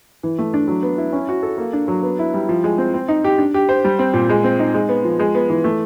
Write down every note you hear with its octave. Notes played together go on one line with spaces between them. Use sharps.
E3
A3
D4
F#3
B3
E4
C#4
F#4
A4
A#3
D4
F#3
B3
E4
G3
F3
G#3
C4
C4
D#4
G4
D4
G4
C5
G3
C4
A#2
G#3
C4
D#4
G#3
B3
F3
G#3
B3
E3
A3